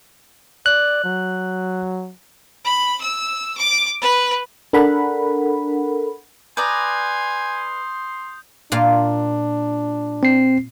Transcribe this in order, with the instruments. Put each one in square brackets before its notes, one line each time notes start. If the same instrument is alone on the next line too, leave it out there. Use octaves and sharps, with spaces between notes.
[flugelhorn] D5 [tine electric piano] F#6
[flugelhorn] F#3
[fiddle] B5
E6
D6
B4
[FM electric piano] D4 A4 A#4 F#5 B5
[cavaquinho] B4 D5 A#5 [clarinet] G#5 [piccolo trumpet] C6 [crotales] D#6 G6
[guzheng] A#2 F4 C6 [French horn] D4
[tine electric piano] C4 C7